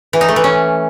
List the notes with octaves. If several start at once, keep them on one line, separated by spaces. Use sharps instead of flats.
E3
D#4
A3
E3
C#4